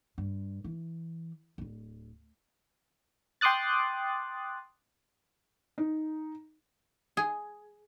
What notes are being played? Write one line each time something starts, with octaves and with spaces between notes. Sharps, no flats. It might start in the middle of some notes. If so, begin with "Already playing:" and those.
G2
E3
D1 G#1
G5 C6 D6 D#6 F#6 A6
D#4
G#4